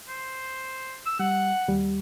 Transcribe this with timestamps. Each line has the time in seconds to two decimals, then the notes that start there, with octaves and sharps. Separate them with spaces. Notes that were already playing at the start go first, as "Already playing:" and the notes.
0.08 C5
1.06 E6
1.19 G3 F#5
1.68 D#2 G3